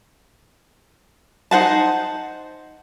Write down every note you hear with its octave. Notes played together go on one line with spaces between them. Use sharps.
D#4 C5 F#5 A5